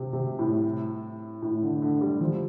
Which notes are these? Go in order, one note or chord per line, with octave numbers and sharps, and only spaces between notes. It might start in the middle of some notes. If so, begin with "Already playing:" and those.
Already playing: C3
C3
A2
A2
D3
D3
G3
F3